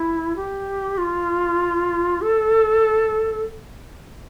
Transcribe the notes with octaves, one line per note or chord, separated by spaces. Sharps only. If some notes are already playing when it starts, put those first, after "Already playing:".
Already playing: E4
G4
F4
A4